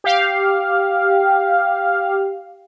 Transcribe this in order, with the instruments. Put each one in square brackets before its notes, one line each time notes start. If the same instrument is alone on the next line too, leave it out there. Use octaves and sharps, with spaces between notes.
[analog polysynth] G4 F5